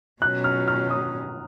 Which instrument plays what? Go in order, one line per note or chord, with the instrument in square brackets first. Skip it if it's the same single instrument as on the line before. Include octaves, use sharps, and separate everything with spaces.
[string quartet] B2 F#3 C#4 [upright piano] F#6
[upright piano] F6
F6
D#6